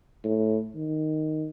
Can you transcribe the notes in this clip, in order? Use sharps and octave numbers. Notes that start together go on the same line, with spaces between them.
A2
D#3